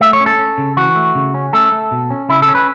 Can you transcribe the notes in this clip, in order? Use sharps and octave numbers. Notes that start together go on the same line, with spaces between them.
A3 E5
C#5
C#4
A4
C#4
C#3
E3 F#4
A3
C#3
C#4
A3 A4
A3
B2
C#4
C#3 E4
A4
C#4
B4